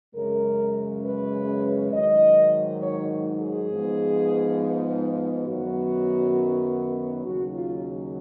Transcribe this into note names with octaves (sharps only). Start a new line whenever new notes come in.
F#2 C#3 G#3 C#4 A#4
B4
G#2 D#3 F#3 D#5
C#5
G#4
G#2 F3 B3
F#2 D#3 F#3 B3 F#4
D#2 C#3 F#3 F#4
F4